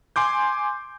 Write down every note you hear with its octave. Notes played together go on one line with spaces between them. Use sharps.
G#5 C6 D6 G6